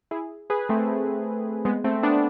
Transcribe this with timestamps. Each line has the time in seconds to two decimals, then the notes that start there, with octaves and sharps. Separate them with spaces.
0.11 E4 G#4
0.50 G#4 B4
0.69 A3 C4
1.65 G#3 B3
1.84 A3 C4
2.03 B3 D4